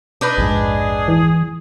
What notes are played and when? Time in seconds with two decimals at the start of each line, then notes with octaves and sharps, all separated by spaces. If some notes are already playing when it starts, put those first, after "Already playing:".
0.21 D4 D#4 B4
0.38 A#1 F2 G#2 G#4
1.08 E3